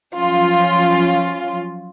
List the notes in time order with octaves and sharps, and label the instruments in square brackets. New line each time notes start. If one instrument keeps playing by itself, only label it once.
[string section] F3 F#3 C#4 F4